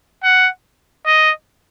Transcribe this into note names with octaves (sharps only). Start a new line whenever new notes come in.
F#5
D#5